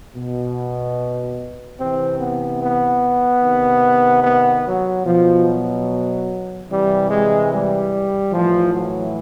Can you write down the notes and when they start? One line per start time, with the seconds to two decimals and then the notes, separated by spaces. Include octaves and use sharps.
0.15 B2
1.77 C3 E3 C4
2.18 B3
2.60 B3
3.41 C3 D#3
4.22 B3
4.64 F#3
5.05 B2 F3
5.45 F#3
6.68 C3 E3 G3
7.09 G#3
7.51 G3
8.32 A2 E3 F3
8.73 F#3